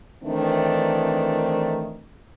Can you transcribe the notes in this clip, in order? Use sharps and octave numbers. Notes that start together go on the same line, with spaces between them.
D#3 E3 A3 C4 D4